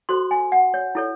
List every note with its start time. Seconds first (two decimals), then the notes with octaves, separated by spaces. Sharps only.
0.09 F#4 A4 C5 C6
0.31 G#5
0.52 F#5
0.74 C#5
0.95 E4 A4 C#5